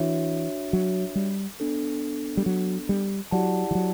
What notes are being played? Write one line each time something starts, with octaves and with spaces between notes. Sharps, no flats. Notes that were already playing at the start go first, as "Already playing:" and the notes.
Already playing: E3 D4 F#4 C#5 E5
F#3
G3
B3 D4 A4
G3
F#3
G3
F#3 E4 G4 D5 F#5 A5
E3
F#3